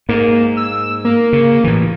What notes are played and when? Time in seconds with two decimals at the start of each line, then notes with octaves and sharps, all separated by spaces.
0.09 G#2 A#3
0.57 E6
1.05 A#3
1.33 C#3
1.64 A2 E3